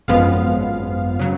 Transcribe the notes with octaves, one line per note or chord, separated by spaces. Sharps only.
G#1 F#2 F3 G#3 B3 F5
C#3 F#3